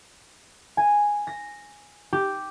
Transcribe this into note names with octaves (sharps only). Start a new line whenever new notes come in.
G#5
A#6
G4